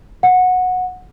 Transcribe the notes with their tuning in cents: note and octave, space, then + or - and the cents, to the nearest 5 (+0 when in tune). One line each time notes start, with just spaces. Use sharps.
F#5 -15